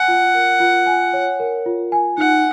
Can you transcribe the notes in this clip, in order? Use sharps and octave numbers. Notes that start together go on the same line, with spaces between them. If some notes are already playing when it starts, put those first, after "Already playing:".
Already playing: F#5 G#5
F4
A#4
F4
G#5
C#5
A#4
F4
G#5
D#4 F#5